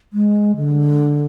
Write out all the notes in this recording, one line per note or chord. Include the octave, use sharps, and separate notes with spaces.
G#3
D3